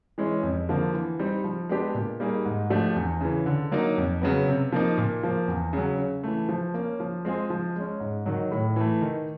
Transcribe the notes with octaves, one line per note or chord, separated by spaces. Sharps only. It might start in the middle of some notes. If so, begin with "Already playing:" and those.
E3 G#3 C#4 E4
F2
D3 F3 A#3
E3
G3 C4 D#4
F3
G#3 B3 D4 G4
A#2
G3 A#3 D#4 G#4
G#2
F3 A3 D4 G4
E2
C#3 E3
D3
F#3 A#3 D#4
F2
C#3 F#3 B3
C3
F3 A#3 D#4
A#2
F3 A#3
E2
C#3 F#3
C#3
E3 A3
F3
A#3 C#4
F3
G#3 C4 F4 G#4
F3
G#3 C#4
G#2
D#3 F#3
A2
E3 A3
D#3